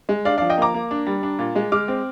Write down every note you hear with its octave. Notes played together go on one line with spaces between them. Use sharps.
G#3
D4 D5 F5
F3 D5 F5
D#5 G5
A#3 A#5 D6
A#3
D4
G3
D4
A#2
G#3
G#3 D6 F6
C4